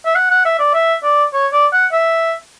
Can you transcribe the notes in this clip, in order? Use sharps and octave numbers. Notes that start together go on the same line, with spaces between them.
E5
F#5
F#5
E5
D5
E5
D5
C#5
D5
F#5
E5